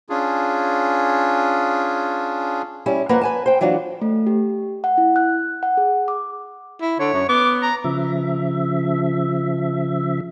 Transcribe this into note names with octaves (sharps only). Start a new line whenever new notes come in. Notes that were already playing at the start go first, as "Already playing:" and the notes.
C#4 D4 F4 G#4
G3 C#4 E4
F2 A#3 A#4 B4 F#5
B4 G#5 A5
C5 G5
E3 F#3 D4 F4 F#4
A3
G4
F#5
E4
F#6
F#5
G#4
D6
E4
D3 C#5
F#2
B3 D6
A#5
C#3 F3 E5